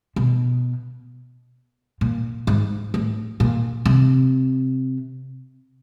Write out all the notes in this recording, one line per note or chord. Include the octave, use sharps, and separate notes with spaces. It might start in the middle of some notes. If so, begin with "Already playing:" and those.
B2
A#2
G#2
A2
A#2
C3